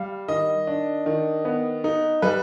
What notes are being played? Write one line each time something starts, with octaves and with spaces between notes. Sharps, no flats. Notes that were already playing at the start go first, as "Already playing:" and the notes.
Already playing: G3 F5
D#3 D#5
D4
D#3
B3
D#4
G3 B4